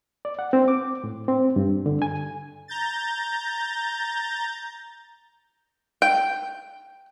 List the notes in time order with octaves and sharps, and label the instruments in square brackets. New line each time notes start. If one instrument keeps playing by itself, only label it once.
[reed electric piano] D5
F#5
C4
D6
A2
C4
G2
D3
G#5
[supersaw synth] A#5 G6 A6
[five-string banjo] G5